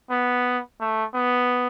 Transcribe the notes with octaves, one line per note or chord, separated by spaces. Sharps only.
B3
A3
B3